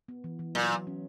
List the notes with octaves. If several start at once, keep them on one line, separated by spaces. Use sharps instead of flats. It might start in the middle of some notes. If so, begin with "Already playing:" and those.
B3
E3
E3
A#2 F#3
F#3
C#4